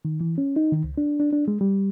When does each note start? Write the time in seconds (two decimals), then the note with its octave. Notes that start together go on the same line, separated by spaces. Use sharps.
0.05 D#3
0.21 E3
0.38 C#4
0.56 D#4
0.72 D#3
0.84 C#2
0.98 D4
1.20 D4
1.33 D4
1.48 G#3
1.61 G3